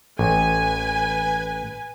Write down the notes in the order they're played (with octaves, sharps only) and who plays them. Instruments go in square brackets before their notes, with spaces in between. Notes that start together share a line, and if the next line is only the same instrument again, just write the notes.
[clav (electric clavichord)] A1 [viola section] B4 G#5